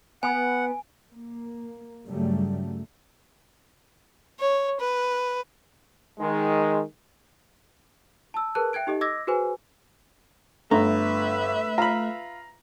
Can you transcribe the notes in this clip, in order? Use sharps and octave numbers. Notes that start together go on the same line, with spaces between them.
B3 F#5 G#5
A#3
G2 C#3 F#3 G3 A3
C#5
B4
D#3 G#3
A5 E6
G#4 A#4 B4 A5 F#6
E5 G5 F#6 G#6 D7
D#4 G4 A4 D#5
D#5 D6 E6 G#6 A#6
F#4 G#4 B4 C5 G#5
G1 A3 B4 E5 A#5
F4 A#5 B5